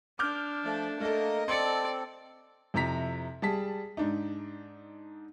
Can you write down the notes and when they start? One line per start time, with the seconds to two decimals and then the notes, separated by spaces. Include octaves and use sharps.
0.19 D4 D6 F6 G6
0.64 F3 A3 D5
1.00 A3 A#3 A4 A#4 D#5
1.48 C4 A4 D5 C6 C#7
2.74 F2 C3 E4 E5 A#5 B6
3.42 G3 G#4 A5 B6
3.97 G#2 D4 D#4